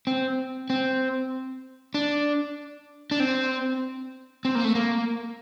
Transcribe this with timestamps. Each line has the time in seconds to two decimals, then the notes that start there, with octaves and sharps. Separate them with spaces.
0.07 C4
0.70 C4
1.94 D4
3.11 D4
3.20 C4
4.45 C4
4.55 A#3
4.65 A3
4.75 A#3